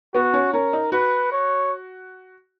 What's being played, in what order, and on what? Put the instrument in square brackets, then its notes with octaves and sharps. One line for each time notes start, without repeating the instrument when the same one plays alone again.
[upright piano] B3 [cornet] F#4
[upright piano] C#4
[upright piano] C#4 [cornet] A#4
[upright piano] D#4
[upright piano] F#4 [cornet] B4
[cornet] C#5